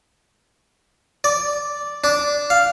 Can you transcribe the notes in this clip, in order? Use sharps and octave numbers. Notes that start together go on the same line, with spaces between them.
D5
D4
F5